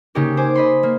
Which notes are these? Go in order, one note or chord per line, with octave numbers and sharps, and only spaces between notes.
C#3 A#3 D#4 G4 A#4
C5 G#5 D6
D#5 B5 C6
A#3